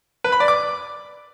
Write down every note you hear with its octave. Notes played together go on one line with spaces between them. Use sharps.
B4
B5
D5
D6